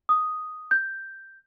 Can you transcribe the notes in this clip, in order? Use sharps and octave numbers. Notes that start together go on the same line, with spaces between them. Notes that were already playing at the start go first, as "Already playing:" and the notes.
D#6
G6